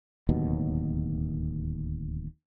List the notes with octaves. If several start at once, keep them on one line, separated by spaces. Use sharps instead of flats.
D1 D#2 B2